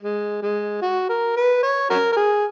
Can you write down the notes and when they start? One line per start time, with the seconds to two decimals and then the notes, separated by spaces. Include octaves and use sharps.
0.02 G#3
0.42 G#3
0.82 F#4
1.09 A#4
1.37 B4
1.63 C#5
1.90 C#4 F#4 A#4
2.12 A#4
2.17 G#4